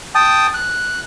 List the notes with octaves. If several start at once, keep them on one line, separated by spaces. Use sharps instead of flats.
G5 A5 D#6
F#6